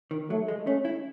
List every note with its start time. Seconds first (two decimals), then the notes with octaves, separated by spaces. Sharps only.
0.11 D#3
0.30 F#3 A3
0.48 G#3
0.67 A3 C#4
0.85 E4